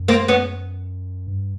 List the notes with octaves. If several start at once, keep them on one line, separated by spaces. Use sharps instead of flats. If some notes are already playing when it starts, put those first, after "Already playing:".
Already playing: F#2
A#3 C4
B3 C#4
G2